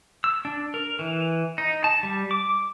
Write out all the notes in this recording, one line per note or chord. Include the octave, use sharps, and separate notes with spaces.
E6
D4
A#4
E3
D#4
A5
G3
D6